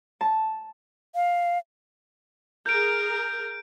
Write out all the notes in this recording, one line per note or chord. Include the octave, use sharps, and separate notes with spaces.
A5
F5
G#4 A#4 G6 D7